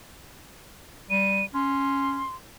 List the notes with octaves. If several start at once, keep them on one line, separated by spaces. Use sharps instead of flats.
G3 D#7
C#4 C6